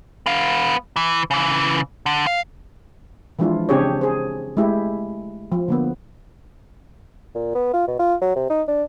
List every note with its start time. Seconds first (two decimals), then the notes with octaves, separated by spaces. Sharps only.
0.26 B3 F5
0.96 E3
1.31 C#3 E3
2.06 D3
2.27 F5
3.39 E3 F3 G#3 D4 E4 F4
3.69 C#3 C4 D4 G4 G#4 C#5
4.01 G#4 C5
4.57 G#3 A3 E4 G4
5.52 F3
5.68 D3 A#3 B3
7.35 A#2
7.55 B3
7.73 F4
7.87 B2
7.99 F4
8.21 F#3
8.36 C3
8.50 D#4
8.68 D4